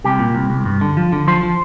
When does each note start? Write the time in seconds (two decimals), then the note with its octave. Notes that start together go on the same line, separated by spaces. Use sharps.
0.04 C2 G4
0.19 A#2
0.35 C2
0.50 C2
0.65 G2
0.81 D3
0.97 F3
1.12 D3
1.27 F3 C5
1.43 F3